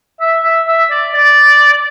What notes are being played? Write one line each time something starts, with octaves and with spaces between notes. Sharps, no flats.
E5
E5
E5
D5
D5